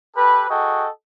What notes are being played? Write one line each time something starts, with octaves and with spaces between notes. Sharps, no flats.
G4 A4 B4
F#4 G#4 A4 D#5 G5